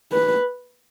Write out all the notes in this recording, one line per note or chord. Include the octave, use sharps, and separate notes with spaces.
B4